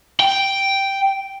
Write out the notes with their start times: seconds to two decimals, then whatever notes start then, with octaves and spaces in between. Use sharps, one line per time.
0.20 G5